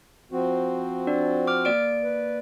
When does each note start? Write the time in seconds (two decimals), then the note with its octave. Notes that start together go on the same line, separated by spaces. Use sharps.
0.32 F3 C4 F#4
1.07 D4 D5
1.47 D6 F6
1.65 A#3 D5 D7
2.04 B4